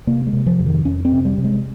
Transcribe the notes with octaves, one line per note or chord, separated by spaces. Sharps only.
C3 A#3
G#3
C3
F3
F2
D#3
F2 C#4
C4
C3
G3
C3
G#3